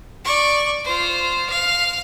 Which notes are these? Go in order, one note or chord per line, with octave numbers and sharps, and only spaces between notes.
D5 C#6
F4 C5
F5